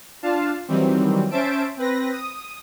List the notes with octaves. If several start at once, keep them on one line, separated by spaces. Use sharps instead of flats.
D4 F4 F5 A5
D#3 E3 F#3 G3 C4
C#4 C5 E5 A5 D7
C4 B4 A#6
D#6